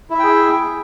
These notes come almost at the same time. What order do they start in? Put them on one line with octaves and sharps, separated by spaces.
E4 E5 G5 G#4